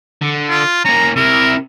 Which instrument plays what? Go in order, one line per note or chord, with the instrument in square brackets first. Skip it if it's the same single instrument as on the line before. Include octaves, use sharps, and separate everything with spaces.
[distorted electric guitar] D3
[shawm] F4
[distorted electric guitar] A#3 C#4 [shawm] A#5
[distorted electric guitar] C3 E4 [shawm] A#4